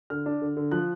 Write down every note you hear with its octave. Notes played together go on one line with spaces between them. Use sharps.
D3 F6
D4
D3
D3
F3 F#6